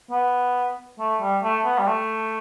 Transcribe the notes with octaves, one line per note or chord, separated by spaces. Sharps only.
B3
A3
G3
A3
B3
G3
A3